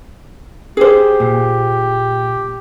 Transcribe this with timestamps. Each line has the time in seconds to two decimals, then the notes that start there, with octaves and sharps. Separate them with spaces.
0.77 G4 G#4 C5
1.20 A#2